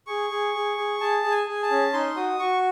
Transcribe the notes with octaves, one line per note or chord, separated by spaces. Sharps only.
G#4 C#6
G#4
G#4
G#4
G#4 A5
G#4
G#5
G#4 G#5
A5
C#4
D#4 C6
F#4 D#6
F#4 C#6